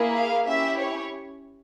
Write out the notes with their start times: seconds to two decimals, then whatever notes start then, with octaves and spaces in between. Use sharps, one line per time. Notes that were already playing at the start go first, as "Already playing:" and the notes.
Already playing: A#3 E4 G#4
0.15 F5
0.47 C#4 E4 G4 E5
0.79 C#5